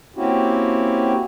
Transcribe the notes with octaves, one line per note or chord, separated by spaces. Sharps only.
A#3 C4 C#4 E4 F#4 G4